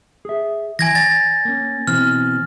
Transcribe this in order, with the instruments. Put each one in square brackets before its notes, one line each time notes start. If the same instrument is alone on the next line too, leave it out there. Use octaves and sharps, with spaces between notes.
[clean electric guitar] G#4 E5
[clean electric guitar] E3 [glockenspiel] G#5 G#6 A#6
[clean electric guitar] D5 [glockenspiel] A6
[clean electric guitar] A#3 C#4
[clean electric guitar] B2 E3 C4 [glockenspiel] F6